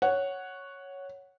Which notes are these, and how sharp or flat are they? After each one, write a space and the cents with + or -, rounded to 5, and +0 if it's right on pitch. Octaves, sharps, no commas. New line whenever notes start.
C#5 +0 F#5 +0